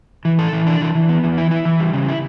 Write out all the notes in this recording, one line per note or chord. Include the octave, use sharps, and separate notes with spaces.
E3
A4
E3
D4
E3
E3
B3
E3
E4
E4
E3
G3
C#3
E4